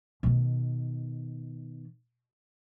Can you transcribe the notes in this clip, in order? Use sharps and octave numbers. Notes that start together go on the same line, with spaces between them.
B2 D#3